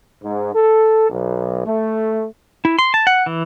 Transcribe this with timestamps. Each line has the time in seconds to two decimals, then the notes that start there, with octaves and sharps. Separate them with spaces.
0.24 G#2
0.54 A4
1.10 B1
1.66 A3
2.65 E4
2.79 C6
2.94 A5
3.07 F#5
3.26 E3